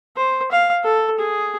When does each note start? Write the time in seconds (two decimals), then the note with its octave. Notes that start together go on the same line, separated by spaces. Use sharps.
0.16 C5
0.52 F5
0.84 A4
1.19 G#4